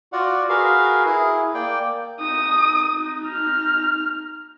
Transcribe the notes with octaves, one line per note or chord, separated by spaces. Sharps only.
F4 F#4 D5 F#5
F#4 G#4 A#4 B4 F5
E4 G#4
A#3 D5 G5
D#4 D#6
F6